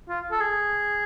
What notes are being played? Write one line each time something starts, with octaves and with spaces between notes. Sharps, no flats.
F4
A4
G#4